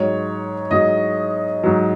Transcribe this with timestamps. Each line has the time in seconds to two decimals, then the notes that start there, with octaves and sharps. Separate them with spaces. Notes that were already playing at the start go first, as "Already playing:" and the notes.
Already playing: G#2 F#3 C#5
0.71 G#2 F#3 D#5
1.63 G#2 F#3